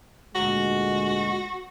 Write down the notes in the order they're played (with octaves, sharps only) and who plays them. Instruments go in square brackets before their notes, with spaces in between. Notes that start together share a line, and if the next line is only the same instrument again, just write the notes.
[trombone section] D2 A#2 G#3 [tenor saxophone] F#4